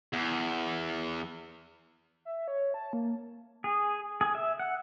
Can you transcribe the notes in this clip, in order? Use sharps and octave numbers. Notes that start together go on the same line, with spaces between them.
E2
E5
C#5
A5
A#3
G#4
G#4
E5
F#5